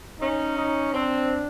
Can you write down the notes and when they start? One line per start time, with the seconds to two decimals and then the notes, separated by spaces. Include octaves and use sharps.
0.20 C#4 D#4
0.57 D#4
0.94 C4 D4